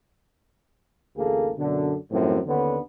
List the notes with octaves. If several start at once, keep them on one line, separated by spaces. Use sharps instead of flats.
A1 D2 A#3 G#4 A4
F#2 B2 D3
F#2 A2 D#3 F3 C4
D#2 D3 B3 C#4 D4